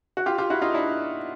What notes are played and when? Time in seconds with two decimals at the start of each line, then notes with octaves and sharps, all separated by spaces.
0.17 F#4
0.26 F4 G4
0.38 F4 G4
0.50 E4 F#4
0.62 D#4 F4
0.74 D4 E4